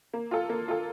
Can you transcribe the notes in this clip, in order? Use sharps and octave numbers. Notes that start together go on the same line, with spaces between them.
A#3
F4 A4
A#3
F4 A4